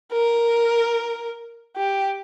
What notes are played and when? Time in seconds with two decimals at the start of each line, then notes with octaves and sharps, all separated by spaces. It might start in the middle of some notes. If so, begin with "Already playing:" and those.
0.12 A#4
1.77 G4